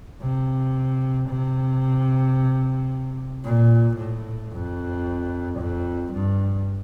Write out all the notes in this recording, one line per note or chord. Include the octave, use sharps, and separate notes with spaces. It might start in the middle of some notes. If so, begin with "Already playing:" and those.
C3
C3
A#2
A2
F2
F2
G2